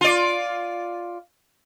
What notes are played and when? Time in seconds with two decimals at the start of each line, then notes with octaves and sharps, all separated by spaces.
0.01 F4 D5